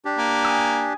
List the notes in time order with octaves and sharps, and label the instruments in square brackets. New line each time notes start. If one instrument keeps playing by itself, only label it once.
[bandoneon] D4 G4
[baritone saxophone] A#3
[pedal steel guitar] G#5 D#6 E6